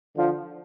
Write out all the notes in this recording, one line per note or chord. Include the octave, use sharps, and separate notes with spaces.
D3 F3